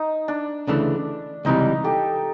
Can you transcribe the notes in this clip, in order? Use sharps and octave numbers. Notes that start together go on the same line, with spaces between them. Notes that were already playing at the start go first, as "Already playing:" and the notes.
Already playing: D#4
D4
D2 C#3 E3 A3 D4
C#2 C3 E3 G3 D#4
G4 A4